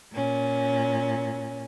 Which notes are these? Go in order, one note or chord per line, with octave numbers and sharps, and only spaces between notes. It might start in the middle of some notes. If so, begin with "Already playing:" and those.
A#2 C#4